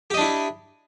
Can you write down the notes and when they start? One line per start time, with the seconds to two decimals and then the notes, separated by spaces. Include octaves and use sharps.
0.10 G4
0.14 D#5
0.17 D4
0.21 E4